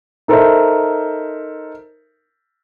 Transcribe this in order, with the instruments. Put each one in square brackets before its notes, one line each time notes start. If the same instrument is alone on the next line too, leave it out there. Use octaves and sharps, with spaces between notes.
[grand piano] D#4 A4 A#4 C5 E5